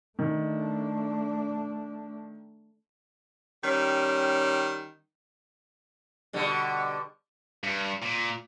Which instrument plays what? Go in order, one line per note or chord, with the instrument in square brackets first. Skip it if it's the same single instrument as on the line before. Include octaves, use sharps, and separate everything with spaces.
[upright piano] D#3 [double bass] A3 D4
[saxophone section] D#3 G3 C#4
[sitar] B2 D3 G3
[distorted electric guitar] G2
A#2